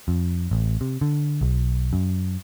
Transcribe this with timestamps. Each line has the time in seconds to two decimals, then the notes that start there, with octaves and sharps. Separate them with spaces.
0.08 F2
0.51 A1
0.81 C3
1.01 D3
1.41 B1
1.93 F#2